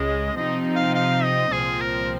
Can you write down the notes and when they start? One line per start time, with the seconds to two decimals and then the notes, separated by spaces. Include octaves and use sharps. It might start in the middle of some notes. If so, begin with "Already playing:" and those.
Already playing: C#2 C#3 G#3 D#5
0.37 C3 F3 C4 D#4 D#5
0.76 F5
0.95 F5
1.24 D#5
1.52 C2 A#2 F3 C4 G#4
1.81 A#4